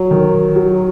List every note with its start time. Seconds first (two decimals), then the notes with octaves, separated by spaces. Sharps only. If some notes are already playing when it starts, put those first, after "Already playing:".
Already playing: F#3
0.11 D#3
0.56 F#3